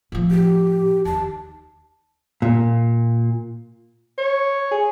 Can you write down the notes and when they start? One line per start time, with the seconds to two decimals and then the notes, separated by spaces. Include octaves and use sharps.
0.12 A2 F3
0.31 G4
1.05 D#2 A5
2.42 A#2
4.18 C#5
4.71 G#4